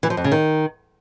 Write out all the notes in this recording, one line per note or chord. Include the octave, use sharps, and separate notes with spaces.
E3
F3
F2
C#3
D#3